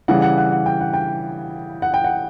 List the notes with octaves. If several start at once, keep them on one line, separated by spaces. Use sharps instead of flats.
C#3 E3 G3 F#5
F#5
F#5
F#5
G5
F#5
G5
F#5
G5
F#5